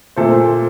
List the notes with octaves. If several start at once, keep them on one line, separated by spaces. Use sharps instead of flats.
A#2 A3 A4 C5